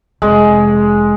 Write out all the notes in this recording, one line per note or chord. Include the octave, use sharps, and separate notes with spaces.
F1 G#3